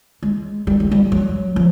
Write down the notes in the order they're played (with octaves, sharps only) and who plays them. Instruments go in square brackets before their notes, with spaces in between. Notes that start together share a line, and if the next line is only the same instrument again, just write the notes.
[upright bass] G#3
G3
G#3
G3
F#3
F3